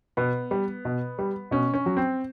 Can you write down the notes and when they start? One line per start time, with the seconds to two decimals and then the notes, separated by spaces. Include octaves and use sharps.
0.17 B2 B3
0.51 G3
0.85 B2
1.19 G3
1.51 B2 C#4
1.74 C#4
1.86 F#3
1.97 C4